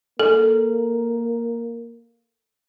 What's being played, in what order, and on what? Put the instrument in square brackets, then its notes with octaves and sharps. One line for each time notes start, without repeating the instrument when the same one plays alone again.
[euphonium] A#3 [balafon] A4